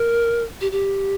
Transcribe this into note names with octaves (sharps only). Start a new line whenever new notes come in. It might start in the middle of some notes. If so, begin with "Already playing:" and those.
Already playing: A#4
G4
G4